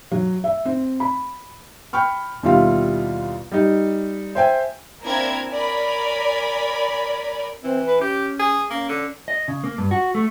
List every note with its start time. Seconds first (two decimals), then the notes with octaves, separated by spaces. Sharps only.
0.12 F#3
0.44 E5
0.65 C4
1.00 B5
1.93 G5 B5 C#6 F6
2.43 D#2 B2 G3 E4 F4 F5
3.52 G3 D#4
4.35 C5 E5 G5 G#5
5.02 A#3 C4 D4 E4 A#4 G#6
5.50 A#4 C#5 D5 G#5 B5
7.64 E3 C4
7.87 B4
8.01 C#4 G4
8.39 G#4
8.70 A#3 C#4
8.89 D3
9.28 D#5
9.48 C#3
9.64 A#3
9.78 G2
9.91 F#4
10.15 A3